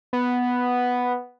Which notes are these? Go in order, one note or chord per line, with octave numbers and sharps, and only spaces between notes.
B3